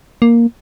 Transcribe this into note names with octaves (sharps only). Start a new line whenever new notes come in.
A#3